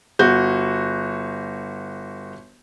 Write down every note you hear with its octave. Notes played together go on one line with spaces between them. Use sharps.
G1 F#4 G6